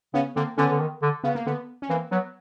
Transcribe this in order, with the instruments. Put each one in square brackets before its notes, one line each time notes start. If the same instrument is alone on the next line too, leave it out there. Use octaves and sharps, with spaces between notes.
[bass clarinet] C#3 [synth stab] B3 C#4
[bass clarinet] D3 [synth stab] A#3 C4
[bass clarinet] D3 [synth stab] B3 C#4
[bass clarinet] D3
D#3
D3
[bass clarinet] C#3 [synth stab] B3
[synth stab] A#3
[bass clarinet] D3 [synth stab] B3
[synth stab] C#4
[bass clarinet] E3 [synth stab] A#3 C4
[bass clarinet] F#3 [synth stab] B3